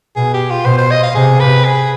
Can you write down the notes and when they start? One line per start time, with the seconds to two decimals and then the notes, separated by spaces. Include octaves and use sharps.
0.16 B2 G#4
0.34 G4
0.50 F4
0.65 B2 C5
0.78 C5
0.91 D#5
1.03 F5
1.14 C3 G#4
1.40 B4
1.65 G#4